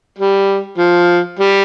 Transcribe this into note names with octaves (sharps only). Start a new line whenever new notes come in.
G3
F3
G3